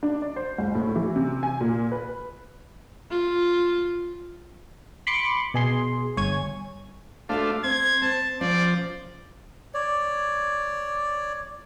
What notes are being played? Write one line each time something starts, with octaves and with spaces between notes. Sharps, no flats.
D4
D5
C5
C#2
A2
E3
C3
G#5
A#2
B4
F4
B5 C6 D6 C#7
B2 G#4 C6
G1 C#5 G#5 G#6
A3 D4 F4 F#4 A4 C5 F5
C4 C5 G#6
C4 A5
F3 C#4 C5 D5
C#5 D5